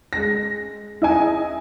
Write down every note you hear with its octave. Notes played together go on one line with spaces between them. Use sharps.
G#3 A#6
E4 D#5 G#5